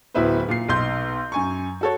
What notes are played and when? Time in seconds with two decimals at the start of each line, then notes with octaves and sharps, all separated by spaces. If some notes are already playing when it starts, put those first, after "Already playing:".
0.14 D1 F#3 B3 E4 B4 C5
0.48 A#2 C7
0.68 B1 D#4 C6 G6
1.32 F#2 G#5 C#6
1.81 F#4 A4 C#5